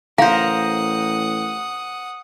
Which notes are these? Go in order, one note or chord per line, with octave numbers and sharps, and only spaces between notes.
A1 A#4 C5 F5 F#5 D#6